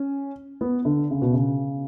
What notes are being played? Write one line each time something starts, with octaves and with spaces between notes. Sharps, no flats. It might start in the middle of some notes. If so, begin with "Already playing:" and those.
Already playing: C#4
B3
D3
C#3
B2
C#3